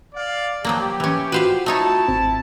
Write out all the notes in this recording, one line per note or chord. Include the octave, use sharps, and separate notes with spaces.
D5 F5
F3 F#3 A#3 G4
E3 C#4
F4 F#4 B4 C5 F5
A3 D#4 E4 C#5 A5
G#1 C4